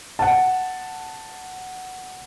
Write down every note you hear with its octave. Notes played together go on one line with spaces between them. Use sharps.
F#5 A5